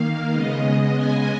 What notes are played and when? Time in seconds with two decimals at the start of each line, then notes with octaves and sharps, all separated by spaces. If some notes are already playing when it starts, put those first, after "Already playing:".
Already playing: D#3 A#3 F5
0.32 C#3 G#3 B3 D#5
0.96 G#5